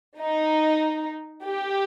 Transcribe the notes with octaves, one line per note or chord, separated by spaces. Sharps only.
D#4
G4